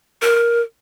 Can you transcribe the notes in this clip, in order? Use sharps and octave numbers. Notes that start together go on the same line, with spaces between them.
A#4